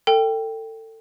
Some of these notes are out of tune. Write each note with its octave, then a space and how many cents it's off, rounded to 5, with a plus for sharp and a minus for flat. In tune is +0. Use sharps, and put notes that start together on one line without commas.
A4 +25 G5 +0